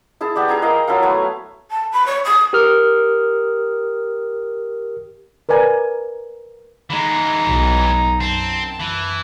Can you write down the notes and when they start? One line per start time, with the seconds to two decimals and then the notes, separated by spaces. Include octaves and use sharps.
0.21 E4 G#4 A5
0.35 B3 G4 D5
0.48 E4 G#4 G#5 A#5
0.62 A#4 D#5 F5 G5
0.88 F#3 E4 A4 F5
1.02 A3 B3 G#5
1.70 A5
1.92 B5
2.05 C#5
2.24 D#6
2.53 G4 A#4 D#6 F6
5.49 A#4 B4 D5 G#5
6.90 E3 G#3 D#4
7.46 B1
8.21 F#2 C4 A5
8.80 E3